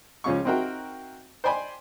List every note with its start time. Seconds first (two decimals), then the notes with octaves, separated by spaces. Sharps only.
0.24 C#2 F3 C#4 F5 C#6
0.45 C4 D#4 F#4 A#4 E5 G5
1.44 C5 D5 G5 G#5 B5 C6